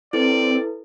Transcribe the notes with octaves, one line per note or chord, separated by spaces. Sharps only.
C4 E4 A4 B4 D5